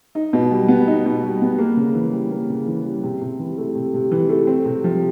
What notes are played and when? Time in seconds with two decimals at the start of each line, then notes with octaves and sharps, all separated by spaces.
0.15 D#4
0.33 B2
0.51 G3
0.68 B3
0.88 D#4
1.06 B2
1.23 G3
1.42 B3
1.59 A#3
1.77 C#3
1.95 E3
2.13 G3
2.32 A#3
2.49 C#3
2.67 E3
2.85 G3
3.03 C3
3.21 C3
3.39 E3
3.57 A3
3.75 C3
3.94 C3
4.12 E3
4.29 A3
4.47 C4
4.65 C3
4.84 F3